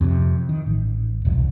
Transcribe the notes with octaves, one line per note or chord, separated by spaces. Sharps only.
F2 C3
D#3
A1
E1 C2